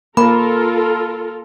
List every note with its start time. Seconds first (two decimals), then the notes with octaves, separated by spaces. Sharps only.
0.17 A#3 F4 A4 A#4 B5